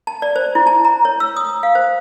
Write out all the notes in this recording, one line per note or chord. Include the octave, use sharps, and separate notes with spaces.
A5
D5
C5
E4
A5
A#5
C#5
E6
D#6
F5
C5